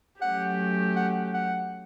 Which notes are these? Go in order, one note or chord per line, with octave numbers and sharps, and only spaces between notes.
F#3 A3 C#4 G4 F#5
F#5
F#5